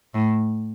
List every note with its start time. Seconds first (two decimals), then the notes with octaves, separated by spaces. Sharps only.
0.14 A2